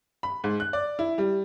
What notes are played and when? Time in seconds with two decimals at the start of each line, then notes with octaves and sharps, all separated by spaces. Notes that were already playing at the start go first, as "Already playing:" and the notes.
0.23 B5
0.44 G#2
0.60 F#6
0.73 D5
0.99 E4
1.18 G3